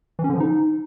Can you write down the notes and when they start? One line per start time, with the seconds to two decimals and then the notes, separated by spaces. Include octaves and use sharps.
0.19 E3
0.24 C#4
0.30 D3
0.35 F3
0.40 D#4